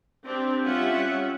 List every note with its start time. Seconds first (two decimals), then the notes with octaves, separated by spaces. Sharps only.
0.24 C4 D4 G4
0.64 G3 C#4 F4 G4 E5 F#5